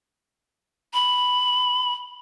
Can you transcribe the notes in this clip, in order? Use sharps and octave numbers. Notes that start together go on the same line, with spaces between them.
B5